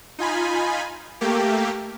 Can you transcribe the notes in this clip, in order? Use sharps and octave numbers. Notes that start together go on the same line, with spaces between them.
D#4 F4 G#5 B5
A3 A#3 G4